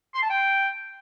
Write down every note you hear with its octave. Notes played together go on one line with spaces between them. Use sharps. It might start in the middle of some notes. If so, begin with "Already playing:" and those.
C6
A5
G5